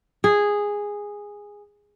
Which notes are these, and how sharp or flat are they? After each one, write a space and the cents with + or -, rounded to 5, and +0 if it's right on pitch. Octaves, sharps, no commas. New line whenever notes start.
G#4 -10